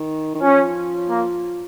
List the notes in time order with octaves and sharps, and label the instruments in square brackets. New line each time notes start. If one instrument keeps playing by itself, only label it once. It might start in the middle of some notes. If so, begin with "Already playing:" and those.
Already playing: [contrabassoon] D#3
D#3
[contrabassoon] F3 [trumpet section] C#4
[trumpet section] A#3